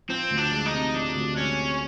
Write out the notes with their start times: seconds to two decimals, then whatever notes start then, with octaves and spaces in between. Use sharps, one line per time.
0.09 F3 C4
0.30 D2
0.37 D4
0.51 G#3
0.66 D#4
0.73 C3
0.94 F3 D4
1.15 D2
1.36 G#3 C#4
1.58 C3